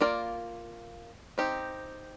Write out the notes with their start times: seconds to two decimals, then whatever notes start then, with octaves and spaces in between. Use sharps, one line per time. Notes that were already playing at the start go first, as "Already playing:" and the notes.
0.01 A#3 F4 A#4 D5
1.38 C4 D#4 G4